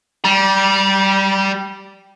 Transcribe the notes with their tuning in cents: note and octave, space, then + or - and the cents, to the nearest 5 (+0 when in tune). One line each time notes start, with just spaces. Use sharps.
G3 -10 B5 -45